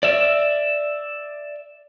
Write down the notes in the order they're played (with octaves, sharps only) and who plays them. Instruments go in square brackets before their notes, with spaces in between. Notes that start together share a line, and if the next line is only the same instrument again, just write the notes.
[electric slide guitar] D5 E5